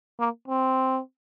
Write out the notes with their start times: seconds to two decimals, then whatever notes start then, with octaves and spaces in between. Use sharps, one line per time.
0.20 A#3
0.48 C4